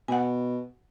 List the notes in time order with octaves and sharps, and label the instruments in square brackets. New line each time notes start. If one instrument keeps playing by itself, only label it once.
[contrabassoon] B2 [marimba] F#5 G#5